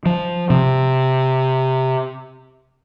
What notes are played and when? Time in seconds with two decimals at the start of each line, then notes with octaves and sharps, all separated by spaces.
0.06 F3
0.50 C3